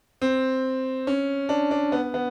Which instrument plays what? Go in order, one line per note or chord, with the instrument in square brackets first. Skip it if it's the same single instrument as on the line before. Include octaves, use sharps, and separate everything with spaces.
[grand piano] C4
C#4
D4
D4
B3
B3